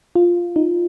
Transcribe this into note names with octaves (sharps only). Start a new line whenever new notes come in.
F4
D#4